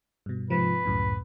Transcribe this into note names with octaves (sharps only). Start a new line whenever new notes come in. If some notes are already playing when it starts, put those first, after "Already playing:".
G2 B2
G#2 C3 F3 B4
C#2 F#2 A2